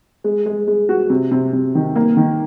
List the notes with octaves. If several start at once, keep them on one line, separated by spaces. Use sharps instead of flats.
G#3
G#3
G#3
F#4
C3
C3
C3
D#3
A#3
D#3